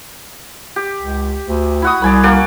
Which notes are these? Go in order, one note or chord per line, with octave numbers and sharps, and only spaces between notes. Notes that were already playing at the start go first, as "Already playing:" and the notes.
G4
C#2
D2
E4 F#4 D#6
C2 D5 G#5 B5
A#3 F#4 D5